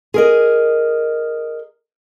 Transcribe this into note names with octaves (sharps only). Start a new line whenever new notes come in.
G#4 A#4 D#5